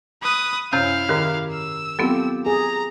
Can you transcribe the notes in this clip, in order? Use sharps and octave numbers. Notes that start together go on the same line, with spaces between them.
B4 D#6
F#2 C3 C#4 E4 F5 G6
G#2 D#3 G4 A#4
E6
F#3 B3 C4 F4 G4 A4
G#4 A#5